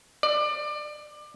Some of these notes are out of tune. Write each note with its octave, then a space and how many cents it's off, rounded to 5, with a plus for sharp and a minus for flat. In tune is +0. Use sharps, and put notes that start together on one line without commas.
D5 +25